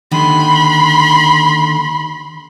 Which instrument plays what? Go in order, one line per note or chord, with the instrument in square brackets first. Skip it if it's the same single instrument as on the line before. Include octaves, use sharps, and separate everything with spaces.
[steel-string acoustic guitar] D#2 D3 D#3 [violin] B5 C6